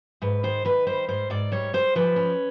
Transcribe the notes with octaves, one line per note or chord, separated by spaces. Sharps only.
G#2 B4
D#3 C5
D#3 B4
G3 C5
G#2 C5
G#2 D5
G3 C#5
G3 C5
F3 B4
C#4